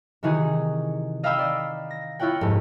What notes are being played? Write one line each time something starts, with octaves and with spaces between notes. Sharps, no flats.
C3 D#3 E3 D#4 F#4 G#4
D#5 F5 G5 A#5 B5 E6
D5 D#5
A#6
E4 F4 C#5 F#5 G5
F1 G#2